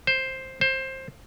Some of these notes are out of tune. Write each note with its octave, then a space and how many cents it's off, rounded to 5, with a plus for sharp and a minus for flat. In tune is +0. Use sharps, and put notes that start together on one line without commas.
C5 +5
C5 +15